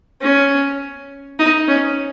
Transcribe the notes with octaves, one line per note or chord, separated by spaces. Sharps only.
C#4
D#4
C#4